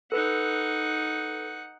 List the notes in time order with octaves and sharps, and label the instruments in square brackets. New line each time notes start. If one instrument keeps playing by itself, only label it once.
[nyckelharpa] D#4 F#5 [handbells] A4 B4